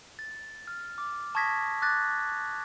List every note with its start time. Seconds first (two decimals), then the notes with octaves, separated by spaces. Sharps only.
0.19 A6
0.68 F6
0.98 D6
1.35 A5 C#6 D#6 G#6 A#6 B6
1.82 D6 F#6 A6 A#6